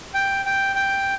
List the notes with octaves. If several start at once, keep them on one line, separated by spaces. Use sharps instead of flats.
G5
G5
G5